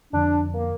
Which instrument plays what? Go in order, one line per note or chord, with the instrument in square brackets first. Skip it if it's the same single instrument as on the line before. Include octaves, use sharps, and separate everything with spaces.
[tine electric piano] F2 D3 F3 [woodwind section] D4
[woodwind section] A#3